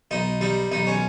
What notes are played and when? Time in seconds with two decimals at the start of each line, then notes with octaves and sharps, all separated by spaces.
0.11 B1 D#4
0.41 G3 D#4
0.72 B1 D#4
0.87 C#4